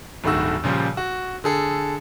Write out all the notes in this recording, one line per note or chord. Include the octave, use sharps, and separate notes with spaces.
D1 G2 D#3 A3 F#4 E6
A#2 C#3 F3 G3
F#4
D3 G#4 A4